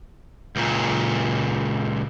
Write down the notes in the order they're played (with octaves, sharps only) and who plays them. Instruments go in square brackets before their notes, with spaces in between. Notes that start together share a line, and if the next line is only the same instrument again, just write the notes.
[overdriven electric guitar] C#2 A#2